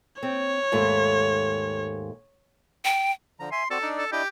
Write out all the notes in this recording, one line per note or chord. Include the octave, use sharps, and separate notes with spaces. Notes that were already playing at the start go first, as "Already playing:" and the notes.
C4 C#5
D#2 G#2 A3
G5
D3 F3 A#5
E5 G#5 C6
C4 F#4 A4 D5
D4 D#4 D5
A4
D4 E4 G4 D#5